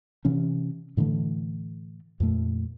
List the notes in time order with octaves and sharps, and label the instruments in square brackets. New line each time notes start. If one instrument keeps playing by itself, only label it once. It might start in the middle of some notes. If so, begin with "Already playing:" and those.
[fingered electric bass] C3 E3 C#4
A2 D3 E3 A3
F2 A#2 A3